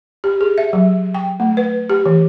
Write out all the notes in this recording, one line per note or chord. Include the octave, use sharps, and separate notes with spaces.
G4
G#4
E5
F#3
G5
A3
B4
G4
E3